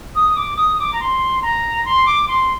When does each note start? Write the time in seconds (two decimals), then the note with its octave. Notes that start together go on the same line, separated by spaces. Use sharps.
0.15 D#6
0.36 D6
0.57 D#6
0.79 D6
0.93 A#5
1.00 C6
1.42 A#5
1.85 C6
2.06 D6
2.28 C6